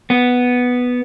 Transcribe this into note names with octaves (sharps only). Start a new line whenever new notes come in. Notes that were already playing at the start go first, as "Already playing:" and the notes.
B3